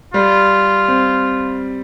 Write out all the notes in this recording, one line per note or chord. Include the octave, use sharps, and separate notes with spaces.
G3 F4
C4